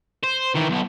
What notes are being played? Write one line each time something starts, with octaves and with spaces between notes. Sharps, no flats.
C5
D#3 E3
B1 B3